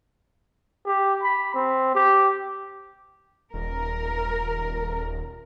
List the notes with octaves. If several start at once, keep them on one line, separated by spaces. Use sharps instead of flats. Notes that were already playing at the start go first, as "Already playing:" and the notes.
G4
B5
C4
G4
D#1 A#4